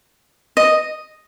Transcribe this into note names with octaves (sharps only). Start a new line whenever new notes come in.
D#5